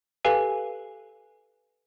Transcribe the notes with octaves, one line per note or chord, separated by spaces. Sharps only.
G4 A4 B4 F5 G#5